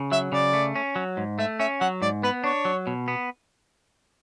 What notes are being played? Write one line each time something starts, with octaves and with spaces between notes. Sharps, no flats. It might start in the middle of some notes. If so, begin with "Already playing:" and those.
Already playing: C#3
F#3 E5
C#3 D5
A3
C#4
F#3
G#2
A3 E5
C#4 E5
F#3 F#5
G#2 D5
B3 B4
D4 C#5
F#3
B2
B3